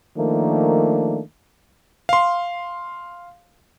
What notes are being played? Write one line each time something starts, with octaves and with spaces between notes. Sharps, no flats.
D#3 F3 A3 A#3 D4
F5 C6